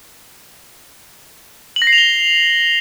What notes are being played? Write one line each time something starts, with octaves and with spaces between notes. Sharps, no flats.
F#7
A#6
C7
F7
G7